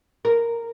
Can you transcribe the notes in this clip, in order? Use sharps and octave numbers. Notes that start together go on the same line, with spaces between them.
A#4